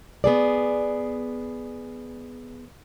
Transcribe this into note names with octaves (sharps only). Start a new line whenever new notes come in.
B3 G#4 D5